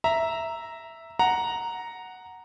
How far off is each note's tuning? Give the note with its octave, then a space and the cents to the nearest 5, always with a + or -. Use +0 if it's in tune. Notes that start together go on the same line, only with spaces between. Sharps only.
E5 +0 A#5 +0
F#5 +0 A#5 +0